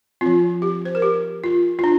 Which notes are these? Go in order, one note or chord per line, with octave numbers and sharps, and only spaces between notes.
F3 C4 F4
G4
C5
A#4
G4
F4
F4
D4